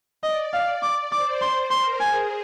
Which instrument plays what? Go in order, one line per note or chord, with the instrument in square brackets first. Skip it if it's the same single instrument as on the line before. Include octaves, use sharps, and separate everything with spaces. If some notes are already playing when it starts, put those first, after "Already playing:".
[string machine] D5 [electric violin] D#5
[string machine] D5 [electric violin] F5
[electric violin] D6
[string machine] C5 [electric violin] D6
[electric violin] C6
[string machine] A#4 [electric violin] C6
[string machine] G#4 [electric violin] G#5